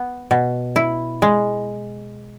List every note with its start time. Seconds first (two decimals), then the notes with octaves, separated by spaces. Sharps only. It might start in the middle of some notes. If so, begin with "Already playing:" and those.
Already playing: B3
0.31 B2
0.76 E4
1.22 G#3